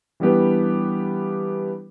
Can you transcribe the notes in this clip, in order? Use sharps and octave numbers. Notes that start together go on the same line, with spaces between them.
E3 G3 B3 D4 G4 B4